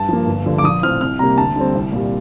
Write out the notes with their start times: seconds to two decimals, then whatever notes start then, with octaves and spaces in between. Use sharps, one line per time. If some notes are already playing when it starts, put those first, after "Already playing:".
Already playing: G2 A5
0.09 F3 A#3
0.27 G1
0.46 G2 D3 F3
0.58 D6
0.64 A#1 D#6
0.82 A2 F3 C4 F6
1.01 C2 F6
1.19 C3 G3 A#3 A#5
1.37 D2 A5
1.56 D3 G3 C4
1.75 C2
1.93 A#2 G3